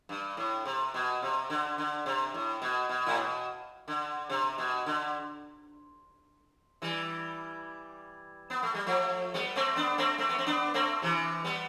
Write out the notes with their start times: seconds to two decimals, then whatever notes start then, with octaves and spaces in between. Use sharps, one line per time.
0.09 G2
0.37 A2
0.65 C3
0.94 B2
1.22 C3
1.50 D3
1.78 D3
2.06 C3
2.34 A2
2.62 B2
2.89 B2
3.07 A2
3.17 B2
3.88 D3
4.30 C3
4.58 B2
4.86 D3
6.82 E3 G3
8.50 B3
8.63 A3
8.75 G3
8.87 F3 A3
9.34 G3 B3
9.56 A3 C4
9.76 B3 D4
9.98 A3 C4
10.18 A3 C4
10.29 B3
10.38 C4
10.46 B3 D4
10.74 A3 C4
11.02 C3 E3
11.44 G3 B3